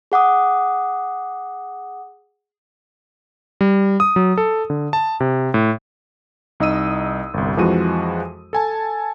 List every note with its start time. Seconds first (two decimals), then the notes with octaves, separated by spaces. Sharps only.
0.12 G#4 F#5 D6 D#6
3.61 G3
4.00 D#6
4.16 F#3
4.38 A4
4.70 D3
4.93 A5
5.20 C3
5.54 A2
6.60 C2 D#4 D#5 D#6 E6 D#7
7.34 G1 C2
7.57 F2 E3 F3 G#3 F#4 D#7
8.53 A4 G#5 A5